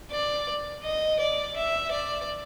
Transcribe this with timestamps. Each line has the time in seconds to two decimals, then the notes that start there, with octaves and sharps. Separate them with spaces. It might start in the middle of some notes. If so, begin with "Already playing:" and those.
0.11 D5
0.84 D#5
1.20 D5
1.56 E5
1.91 D5